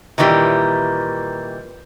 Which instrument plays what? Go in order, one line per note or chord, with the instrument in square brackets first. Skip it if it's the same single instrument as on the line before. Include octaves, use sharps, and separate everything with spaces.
[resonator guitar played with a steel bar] A#2 D#3 E3 F#3 G3